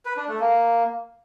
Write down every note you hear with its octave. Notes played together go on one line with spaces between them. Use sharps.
B4
D4
A3
A#3